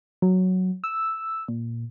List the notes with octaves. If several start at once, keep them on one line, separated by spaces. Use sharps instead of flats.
F#3
E6
A#2